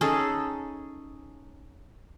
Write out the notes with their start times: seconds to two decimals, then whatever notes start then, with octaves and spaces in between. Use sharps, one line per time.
0.01 C#4 D#4 G#4 A4